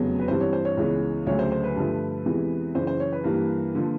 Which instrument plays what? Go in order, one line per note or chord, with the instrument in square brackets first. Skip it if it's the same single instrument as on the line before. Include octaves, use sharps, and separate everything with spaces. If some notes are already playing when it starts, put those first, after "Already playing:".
Already playing: [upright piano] F1 E2 C#3 F#3 B3
B4
G2 E3 G3 C4 C5
C#5
C5
C#5
C#2 C#3 E3 G#3 B3
D2 C#3 F#3 A3 C#5
C5
C5
B4
G2 D3 F3 A3
E2 C3 E3 G#3 B3
F#2 C#3 E3 C5
C5
C#5
B4
G2 E3 G3 A#3
D3 F3 A#3